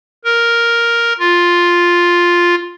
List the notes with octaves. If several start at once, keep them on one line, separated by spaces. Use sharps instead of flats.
A#4
F4